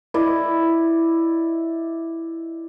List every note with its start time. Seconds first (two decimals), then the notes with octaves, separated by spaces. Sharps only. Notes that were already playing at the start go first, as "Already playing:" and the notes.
0.14 E4 D5 D#5